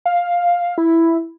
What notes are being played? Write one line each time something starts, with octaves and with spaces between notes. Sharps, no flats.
F5
E4